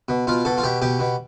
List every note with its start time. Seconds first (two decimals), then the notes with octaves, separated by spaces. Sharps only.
0.09 B2
0.27 B2 F4
0.45 B2 A4
0.58 F4
0.63 B2 G4
0.82 B2 G4
0.99 B2